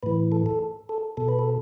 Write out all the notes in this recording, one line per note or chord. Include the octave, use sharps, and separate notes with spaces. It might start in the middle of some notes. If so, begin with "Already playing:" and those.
A2 E3 B4
A4
A4
A4
B2 A4
B4
A4